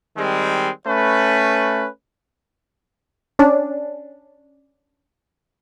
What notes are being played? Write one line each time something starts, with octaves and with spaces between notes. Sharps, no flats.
D#3 G3 G#3 C4
A3 C#4 B4
C#4 D4